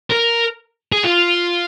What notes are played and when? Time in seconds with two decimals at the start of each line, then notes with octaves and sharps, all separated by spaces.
0.12 A#4
0.92 G#4
1.04 F4